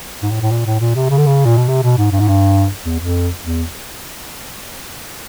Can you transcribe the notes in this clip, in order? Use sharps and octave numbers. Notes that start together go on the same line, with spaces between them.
G#2
A2
A2
A#2
A2
A#2
C3
C#3
D3
C#3
A#2
B2
C3
B2
G#2
G2
G#2
G2
E2
F2
E2